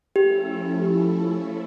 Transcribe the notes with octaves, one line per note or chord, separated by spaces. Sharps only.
F3 A3 C#4 E4 G4 A4